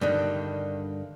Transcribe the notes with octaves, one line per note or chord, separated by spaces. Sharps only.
G2 D3 D#3